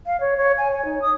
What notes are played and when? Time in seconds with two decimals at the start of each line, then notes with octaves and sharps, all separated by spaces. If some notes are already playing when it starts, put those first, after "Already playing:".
0.06 F5
0.20 C#5
0.37 C#5
0.58 G#5
0.72 C#5
0.85 D#4
1.02 D#6